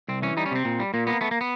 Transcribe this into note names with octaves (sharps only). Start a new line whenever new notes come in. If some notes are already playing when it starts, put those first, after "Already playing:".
C2 C4
E3 C#4
G3 D#4
C#4
C3 C4
A#2
G3
A#2 A#3
A#3 B3
A3 B3
A#3
B3